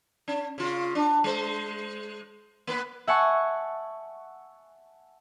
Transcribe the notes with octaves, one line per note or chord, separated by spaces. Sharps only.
C#4
C#3 F4
D4
G#3 C5
A#3 B3 B4
E5 F#5 G#5 A5 C#6